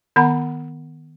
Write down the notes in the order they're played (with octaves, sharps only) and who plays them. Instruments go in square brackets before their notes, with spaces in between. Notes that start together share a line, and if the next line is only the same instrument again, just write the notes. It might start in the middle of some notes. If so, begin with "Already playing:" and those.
[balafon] D#3 B3 F#5 A#5 B5